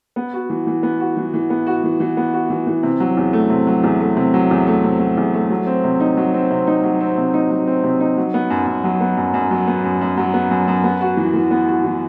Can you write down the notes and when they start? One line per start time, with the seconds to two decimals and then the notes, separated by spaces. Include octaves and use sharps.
0.16 B3
0.33 F#4
0.50 E3
0.67 E3
0.83 B3
1.00 F#4
1.17 E3
1.34 E3
1.50 B3
1.67 F#4
1.84 E3
2.00 E3
2.17 B3
2.33 F#4
2.50 E3
2.67 E3
2.83 C3
3.00 F#3
3.17 E2
3.33 A3
3.50 C3
3.67 F#3
3.83 E2
4.01 A3
4.17 C3
4.34 F#3
4.50 E2
4.67 A3
4.84 C3
5.00 F#3
5.17 E2
5.34 A3
5.50 F#3
5.67 C4
5.84 C3
6.00 D#4
6.17 F#3
6.34 C4
6.50 C3
6.67 D#4
6.84 F#3
7.00 C4
7.17 C3
7.34 D#4
7.51 F#3
7.67 C4
7.83 C3
8.00 D#4
8.17 F#3
8.34 B3
8.50 F#2
8.67 F#2
8.84 F#3
9.01 B3
9.17 F#2
9.34 F#2
9.51 F#3
9.67 B3
9.84 F#2
10.01 F#2
10.17 F#3
10.34 B3
10.51 F#2
10.68 F#2
10.84 B3
11.01 F#4
11.17 E3
11.34 E3
11.51 B3
11.68 F#4
11.84 E3